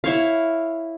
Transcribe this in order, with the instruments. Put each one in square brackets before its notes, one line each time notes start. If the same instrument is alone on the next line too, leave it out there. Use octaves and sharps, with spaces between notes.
[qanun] E4 C#5 F5